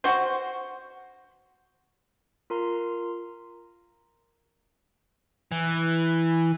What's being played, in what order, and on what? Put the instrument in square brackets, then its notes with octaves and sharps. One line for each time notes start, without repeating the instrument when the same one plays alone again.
[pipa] F#4 C5
[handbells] F4 A#4 A#5 C6
[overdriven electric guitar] E3